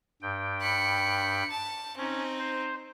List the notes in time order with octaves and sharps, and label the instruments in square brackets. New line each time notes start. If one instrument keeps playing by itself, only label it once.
[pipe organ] G2 G5
[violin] B5 C#7
A5
[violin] C4 D#4 [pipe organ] C#4
[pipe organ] C5